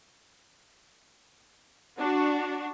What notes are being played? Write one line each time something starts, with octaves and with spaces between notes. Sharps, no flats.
D4 F#4